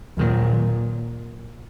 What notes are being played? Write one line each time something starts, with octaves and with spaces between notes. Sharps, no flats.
D#2 A#2 D#3 F#3